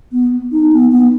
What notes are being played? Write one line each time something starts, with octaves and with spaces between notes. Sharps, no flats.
B3
D#4
B3
B3